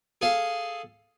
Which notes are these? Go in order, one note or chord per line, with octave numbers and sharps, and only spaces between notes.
G#4 A4 F5